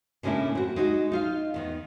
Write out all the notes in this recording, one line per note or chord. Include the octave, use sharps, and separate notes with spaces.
A2 C#3 G#3 A#3 D4 E4
C4 F#4
G#3 D#4 F#4
D#4 F4 F5
E2 D#3 B3